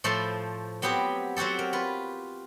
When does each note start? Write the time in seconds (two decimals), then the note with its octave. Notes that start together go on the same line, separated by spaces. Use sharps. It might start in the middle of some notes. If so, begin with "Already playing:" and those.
0.04 A2 F3 A3 A4 C5 C6
0.82 F#3 B3 C4 G4
1.37 F#3 C4 F#4 G4 A4
1.59 A#4
1.73 F4 B4